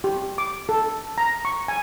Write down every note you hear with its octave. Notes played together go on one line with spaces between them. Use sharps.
G4
D6
A4
A#5
C#6
G#5